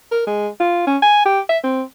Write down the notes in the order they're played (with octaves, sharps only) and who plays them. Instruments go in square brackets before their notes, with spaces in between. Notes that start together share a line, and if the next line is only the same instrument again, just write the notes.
[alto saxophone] A#4
G#3
F4
C#4
G#5
G4
E5
C4